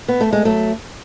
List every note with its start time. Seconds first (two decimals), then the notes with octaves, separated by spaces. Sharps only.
0.08 B3
0.21 A3
0.33 G#3
0.45 F#3 A3